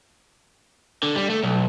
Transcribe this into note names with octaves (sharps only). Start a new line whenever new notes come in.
D3
G3
A3
B1